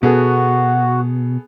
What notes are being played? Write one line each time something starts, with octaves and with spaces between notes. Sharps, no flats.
B2 B3 F#4 G#4 A4